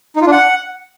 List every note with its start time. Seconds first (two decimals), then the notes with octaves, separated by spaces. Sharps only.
0.16 D#4
0.21 F4
0.27 D4
0.32 F#5